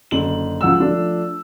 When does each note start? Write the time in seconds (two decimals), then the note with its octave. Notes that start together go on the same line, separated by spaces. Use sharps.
0.11 F#1 D3 F#7
0.61 C#2 F3 F#5 E6
0.80 F3 A3 D4